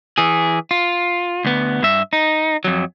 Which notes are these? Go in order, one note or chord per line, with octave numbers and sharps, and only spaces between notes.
E3 G#4
F4
D2 B3
G2 E5
D#4
F2 F#3